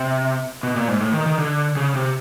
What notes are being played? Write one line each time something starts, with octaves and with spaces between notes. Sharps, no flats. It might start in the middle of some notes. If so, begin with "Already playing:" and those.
Already playing: C3
B2
A#2
G#2
A2
D#3
D#3
D3
C#3
C3